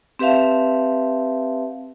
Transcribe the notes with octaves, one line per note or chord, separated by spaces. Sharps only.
C4 G4 B4 E5 F5 A5